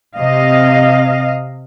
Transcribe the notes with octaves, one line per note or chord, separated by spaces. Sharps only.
C3 D#5 F5